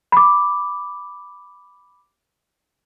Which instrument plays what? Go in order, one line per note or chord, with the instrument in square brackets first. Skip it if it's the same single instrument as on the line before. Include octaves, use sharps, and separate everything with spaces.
[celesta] B5 D6